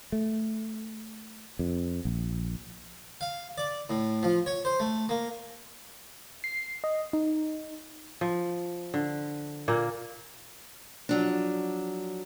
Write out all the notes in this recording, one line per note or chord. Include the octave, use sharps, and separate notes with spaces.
A3
F2
A#1
F5
D5
A2
F3
C#5
C5
A3
A#3
C7
D#5
D#4
F3
D3
A#2 A#3
F3 F#3 D4